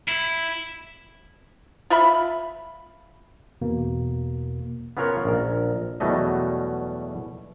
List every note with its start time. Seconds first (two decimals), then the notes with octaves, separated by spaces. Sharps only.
0.08 E4
1.90 F4 E5 B5
3.62 E2 B2 A#3
4.97 B3 C#4 F4 A#4 C#5 F#5
5.25 A#1 A#4
6.00 E2 B2 F#3 G3 A3 D#5